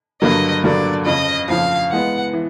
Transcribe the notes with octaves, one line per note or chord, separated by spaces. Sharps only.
G2 D3 F#3 A#3 D#5
G2 D3 F#3 A#3 D5
F2 C#3 F3 D#5
F2 C#3 F3 F5
E3 G#3 B3 F#5
E3